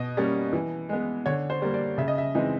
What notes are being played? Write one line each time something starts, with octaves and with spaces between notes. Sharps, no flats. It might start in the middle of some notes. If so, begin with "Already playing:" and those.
Already playing: B2 D#5
G3 A#3 C#4
E3
G#3 B3
D3 C#5
C5
G3 A#3
D5
C#3 E5
D#5
E5
E3 G#3 C4 D#4